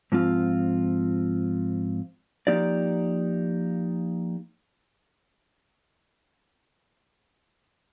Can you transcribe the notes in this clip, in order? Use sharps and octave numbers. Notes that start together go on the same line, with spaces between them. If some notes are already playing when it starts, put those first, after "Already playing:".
G#2 F3 C4 F4
F3 A#3 D#4 G4 D5